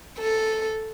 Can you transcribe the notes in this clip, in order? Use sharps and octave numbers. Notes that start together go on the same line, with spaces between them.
A4